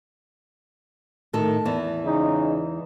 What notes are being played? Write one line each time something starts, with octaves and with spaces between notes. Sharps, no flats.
A2 D#3 A4
E2 E3
C#3 G#3 D#4